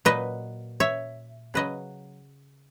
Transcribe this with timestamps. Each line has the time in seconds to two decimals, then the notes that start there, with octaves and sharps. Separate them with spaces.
0.05 A#2 F#3 B4 D#5
0.80 C#5 E5
1.54 C#3 F#3 B4 D#5